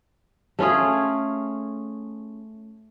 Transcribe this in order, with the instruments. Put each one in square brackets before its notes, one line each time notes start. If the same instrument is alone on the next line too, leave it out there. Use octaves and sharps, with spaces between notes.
[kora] A3 C#4 F4 G#4